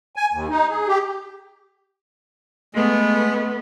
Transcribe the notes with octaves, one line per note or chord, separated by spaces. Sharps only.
G#5
D#2
D#4
G#4
G4
G#3 A3 B3